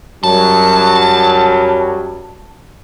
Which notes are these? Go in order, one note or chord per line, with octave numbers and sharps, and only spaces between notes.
F#2 F#3 G3 A5